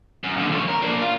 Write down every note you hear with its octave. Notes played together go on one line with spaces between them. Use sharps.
F#2
D#2 D3
F3 C#5
A#4
A#3 D4
F4